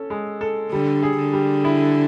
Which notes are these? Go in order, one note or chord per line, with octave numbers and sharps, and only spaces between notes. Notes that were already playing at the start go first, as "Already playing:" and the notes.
Already playing: C#4 A4
G#3
A4
D3 G3
G#4
D3
G3
E4